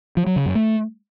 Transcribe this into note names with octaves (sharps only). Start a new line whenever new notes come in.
F3
F#3
C#3
F#2
A3